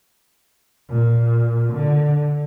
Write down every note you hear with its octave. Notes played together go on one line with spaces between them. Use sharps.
A#2
D3